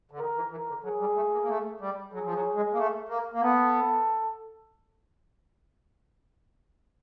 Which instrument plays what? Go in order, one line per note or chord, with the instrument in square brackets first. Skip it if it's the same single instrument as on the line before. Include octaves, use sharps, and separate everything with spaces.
[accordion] D3
[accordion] D#3 [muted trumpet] A#4
[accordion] E3
[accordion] E3 [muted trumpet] A#4
[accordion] D3
[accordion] F#3 [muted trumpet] G#4
[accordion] G3
A3
A#3
A#3
A3
G3
[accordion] F#3 [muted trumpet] G#4
[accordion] F3
F#3
G#3
A#3
A3
A#3
A#3
[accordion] B3 [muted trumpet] A4